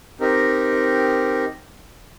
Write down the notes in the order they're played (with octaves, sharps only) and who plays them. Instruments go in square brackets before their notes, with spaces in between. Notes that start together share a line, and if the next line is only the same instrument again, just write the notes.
[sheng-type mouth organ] C4 D#4 G4 A#4